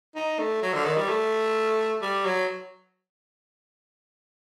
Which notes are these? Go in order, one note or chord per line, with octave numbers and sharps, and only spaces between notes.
D#4
A3
F#3
D3
D#3
G3
A3
G3
F#3